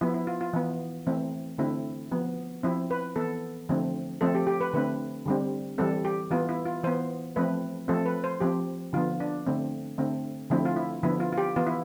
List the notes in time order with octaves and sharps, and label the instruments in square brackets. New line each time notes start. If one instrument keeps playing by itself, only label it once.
[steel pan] F3 B3 E4
E4
F4
F4
E3 B3
E3 A3 C4
D3 A3 C4 E4
F3 B3
F3 C4 E4
B4
E3 B3 A4
D3 F3 A3 C4
F3 A3 C4 A4
G4
G4
B4
D3 A3 C4 B4
D3 G3 C4
E3 G3 C4 A4
G4
E3 B3 F4
E4
F4
E3 B3 C5
F3 A3 C4 B4
F3 A3 C4 A4
B4
C5
F3 C4 G4
D3 F3 B3 F4
D4
D3 A3 C4
D3 A3 C4
D3 F3 A3 C4 E4
F4
E4
D3 F3 B3 E4
F4
F4
G4
E3 B3 F4
E4